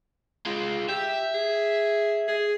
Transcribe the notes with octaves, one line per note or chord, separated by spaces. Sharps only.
G#3 F4
G4 E5
G#4
G#4